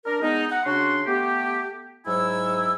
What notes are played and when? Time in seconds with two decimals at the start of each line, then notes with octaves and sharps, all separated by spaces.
0.05 D4 A#4
0.22 G#3 B3 D#4
0.51 F#5
0.65 C#3 D4 F#4 C6
1.06 A3 B3 G4
2.06 G#2 F#3 E4 G#5 E6